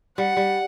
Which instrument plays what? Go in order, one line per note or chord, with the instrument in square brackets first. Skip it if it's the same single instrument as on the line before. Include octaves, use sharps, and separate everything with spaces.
[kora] G3 [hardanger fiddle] F#5
[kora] G3